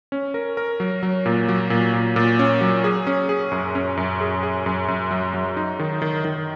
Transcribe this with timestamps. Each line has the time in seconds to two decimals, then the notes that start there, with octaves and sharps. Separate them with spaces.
0.12 C#4
0.34 A#4
0.57 A#4
0.80 F#3
1.03 F#3
1.26 A#2
1.48 F#3
1.70 A#2
1.94 A#2
2.16 A#2
2.39 C#4
2.61 F#3
2.84 G#4
3.07 C#4
3.29 G#4
3.52 F#2
3.75 C#4
3.97 F#2
4.21 G#4
4.43 G#4
4.66 F#2
4.88 F#2
5.11 F#3
5.34 F#3
5.57 D#4
5.79 D#3
6.02 D#3
6.25 D#3